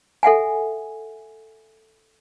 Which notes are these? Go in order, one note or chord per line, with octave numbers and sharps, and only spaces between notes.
A4 E5 F#5 G#5